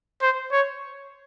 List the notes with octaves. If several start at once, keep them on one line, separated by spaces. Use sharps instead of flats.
C5
C#5